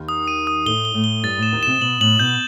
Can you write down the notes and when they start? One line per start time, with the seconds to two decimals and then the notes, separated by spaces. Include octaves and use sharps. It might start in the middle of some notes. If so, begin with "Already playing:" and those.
Already playing: D#2 D#3
0.09 D#6
0.28 D#7
0.47 D#6
0.66 A2 A3 G7
0.85 G7
0.94 A2 A3
1.04 G7
1.23 G2 G3 A6
1.38 A2 E7
1.52 D#2 D#3
1.63 C3 E7
1.81 B2 F#7
2.00 A2 F#7
2.19 B2 G6